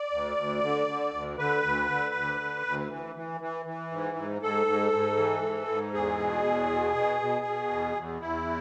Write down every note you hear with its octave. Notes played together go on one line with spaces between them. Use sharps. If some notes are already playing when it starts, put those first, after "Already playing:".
Already playing: D5
D2
D2
D3
D3
D2
D3 B4
D2
D3
D2
D3
D2
E3
E3
E3
E3
G#2
G#2
G#2 A4
G#2
G#2
E3
G#2
G#2
E2 G#4
B2
E2
B2
B2
B2
B2
E2
E2
E2 E4